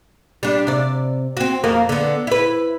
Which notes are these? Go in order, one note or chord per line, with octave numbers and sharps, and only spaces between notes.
G3 D4
C3 D5
C4 F#4
F2 A#3 A#4
D3 B3
E4 B4